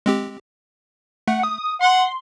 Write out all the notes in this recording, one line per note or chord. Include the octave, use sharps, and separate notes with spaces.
G#3 C4 G4
A3 F#5
D#6
F#5 C6